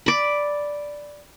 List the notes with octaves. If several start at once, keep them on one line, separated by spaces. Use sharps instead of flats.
D5 B5